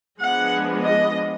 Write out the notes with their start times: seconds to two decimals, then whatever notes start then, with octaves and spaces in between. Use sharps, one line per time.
0.19 F3 G#3 B3 D4 F#5
0.84 D#5